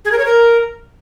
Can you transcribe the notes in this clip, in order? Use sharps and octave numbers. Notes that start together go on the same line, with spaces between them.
G#4
A#4
C#5
A#4